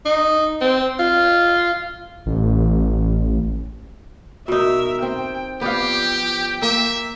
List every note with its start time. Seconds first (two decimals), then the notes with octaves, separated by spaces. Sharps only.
0.06 D#4
0.61 C4
0.99 F4
2.26 A1
4.48 B2 D#4 A#4 E5
5.02 C4 G5
5.61 F3 B3 G4 D5 F5 G5
6.62 A#3 E5